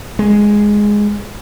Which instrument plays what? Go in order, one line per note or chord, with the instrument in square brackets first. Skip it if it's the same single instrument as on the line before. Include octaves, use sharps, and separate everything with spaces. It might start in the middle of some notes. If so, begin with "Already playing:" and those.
[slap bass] G#3